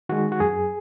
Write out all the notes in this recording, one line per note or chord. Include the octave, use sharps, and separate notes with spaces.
D#3 G#3 F#4
F#4
F#2 G#4